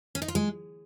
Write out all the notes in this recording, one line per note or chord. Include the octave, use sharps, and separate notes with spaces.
C#4
D#4
F4
G#3